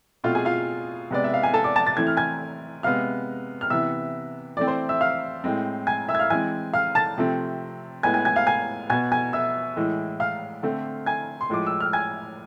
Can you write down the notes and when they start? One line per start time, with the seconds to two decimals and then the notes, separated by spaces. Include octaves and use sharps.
0.24 B2 A3 C4 F4 F5
0.35 G#4 G#5
0.45 F4 F5
1.11 C3 G#3 B3 D5
1.24 E5
1.34 F5
1.43 G#5
1.54 A4 A5
1.64 D5 D6
1.76 A5 A6
1.87 A6
1.97 E3 A3 C4 G#6
2.07 F6
2.17 G#5 G#6
2.83 C3 G#3 B3 F5 F6
3.61 F6
3.70 C3 E3 B3 E5 E6
4.57 E3 A3 C4 D5 D6
4.67 C5 C6
4.89 E5 E6
5.01 F5 F6
5.44 A2 G#3 C4
5.87 G#5 G#6
6.09 E5 E6
6.15 G#6
6.19 F5 F6
6.30 E3 G#3 C4 G#5 G#6
6.74 F5 F6
6.95 A5 A6
7.17 C3 F3 A3 C4
8.03 A2 G#3 B3 G#5 G#6
8.14 G#5 G#6
8.25 G#5 G#6
8.36 F5 F6
8.47 G#5 G#6
8.90 B2 B3 G#5 G#6
9.12 G#5 G#6
9.33 E5 E6
9.77 A2 E3 G#3
10.20 F5 F6
10.63 D3 A3 C4
11.06 G#5 G#6
11.41 C6
11.50 A2 F3 G#3 D6
11.67 E6
11.80 F6
11.93 G#5 G#6